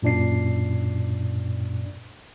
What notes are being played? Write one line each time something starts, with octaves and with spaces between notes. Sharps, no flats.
F#2 A#2 D4 D5 C7